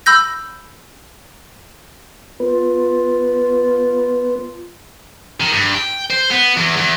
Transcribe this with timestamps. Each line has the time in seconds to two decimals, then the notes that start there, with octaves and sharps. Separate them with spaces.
0.06 B5 E6 G6 A#6
2.40 B3 F4 B4
5.40 D#3
5.52 G2
5.75 G5
6.10 C5
6.31 B3
6.57 E2
6.77 E2